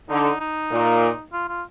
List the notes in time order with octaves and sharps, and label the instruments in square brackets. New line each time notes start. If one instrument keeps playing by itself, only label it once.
[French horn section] D3 [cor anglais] D#4
[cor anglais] D#4
[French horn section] A#2
[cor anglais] F4
F4